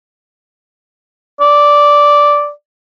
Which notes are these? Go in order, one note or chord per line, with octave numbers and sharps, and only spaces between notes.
D5